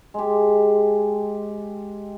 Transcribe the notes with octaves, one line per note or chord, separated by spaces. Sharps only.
G#3 G4